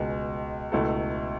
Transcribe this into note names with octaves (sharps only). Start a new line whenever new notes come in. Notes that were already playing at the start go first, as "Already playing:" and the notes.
Already playing: C#2 B2 G#3
C#2 B2 A3 E4 A4